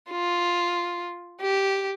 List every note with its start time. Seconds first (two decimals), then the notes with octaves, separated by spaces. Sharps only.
0.10 F4
1.41 G4